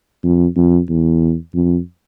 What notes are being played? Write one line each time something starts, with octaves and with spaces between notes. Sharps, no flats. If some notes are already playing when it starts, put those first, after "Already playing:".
F2
F2
E2
F2